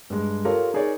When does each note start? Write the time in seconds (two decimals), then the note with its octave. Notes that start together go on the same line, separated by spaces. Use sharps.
0.10 G2 G#3
0.45 F4 G4 A4 A#4 C#5
0.74 D#4 G#4 A#4 C#5 D5